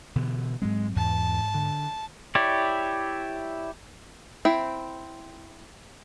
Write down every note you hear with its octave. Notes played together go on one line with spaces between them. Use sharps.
B2 D3 E3
G#2 F#3 G#3 C4
E2 G#2 A5
D3
E4 G4 C#5 D5
C4 E4 G5